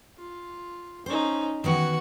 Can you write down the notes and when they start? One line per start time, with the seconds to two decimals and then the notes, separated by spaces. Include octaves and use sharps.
0.18 F4
1.06 C#4 D#4 C5
1.64 D#3 E3 B3 F#4 F#5